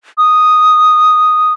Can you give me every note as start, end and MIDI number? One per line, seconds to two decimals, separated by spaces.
0.18 1.53 87